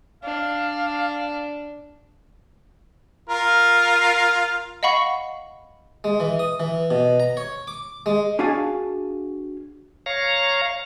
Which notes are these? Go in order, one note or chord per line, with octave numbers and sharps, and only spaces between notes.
D4 F5
F4 A#4
D#5 F5 F#5 B5 C#6 C#7
G#3
E3
D#6
E3
B2
A#5
C#5
D6
G#3
D4 F#4 G#4 F5 G#5 A5
C#5 F5 A#5